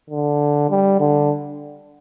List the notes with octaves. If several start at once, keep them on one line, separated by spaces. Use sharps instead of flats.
D3
G3
D3